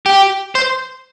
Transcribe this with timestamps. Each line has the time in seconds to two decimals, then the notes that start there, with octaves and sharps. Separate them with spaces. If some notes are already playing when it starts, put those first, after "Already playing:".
0.06 G4
0.55 C5